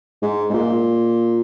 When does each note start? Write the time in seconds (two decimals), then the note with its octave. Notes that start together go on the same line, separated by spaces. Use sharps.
0.22 G#2
0.49 G#2
0.54 A#2